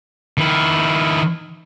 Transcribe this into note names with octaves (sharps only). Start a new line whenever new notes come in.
D#3 E4